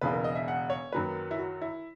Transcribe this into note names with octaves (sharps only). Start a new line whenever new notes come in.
E1 E2 C#3 B4
A#4
D#5
E5
F#5
C#5
F#2 D#3 F#3 A#3 B4
E4
F#4
E4